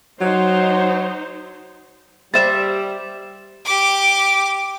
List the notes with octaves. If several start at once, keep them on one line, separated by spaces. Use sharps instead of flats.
F#3 D#4 C5
G3 C5 E5 A6 E7
G4 D6